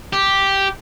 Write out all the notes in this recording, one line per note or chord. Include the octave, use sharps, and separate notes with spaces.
G4